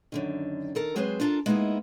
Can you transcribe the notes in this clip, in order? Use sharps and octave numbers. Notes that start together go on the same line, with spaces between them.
F#2 D3 D#3
D#3 A4 A#4
F#3 G#3 C4 G#4 B4 C5
D4 F4 A4 A#4 A5 A#5
G#3 A#3 B3 D#4 E4 G#4